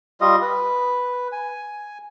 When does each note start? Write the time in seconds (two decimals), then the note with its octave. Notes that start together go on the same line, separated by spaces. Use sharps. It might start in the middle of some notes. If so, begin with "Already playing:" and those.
0.21 G3 F4 D#5
0.42 B4
1.32 G#5